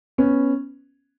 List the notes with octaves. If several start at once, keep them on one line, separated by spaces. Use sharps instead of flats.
B3 C#4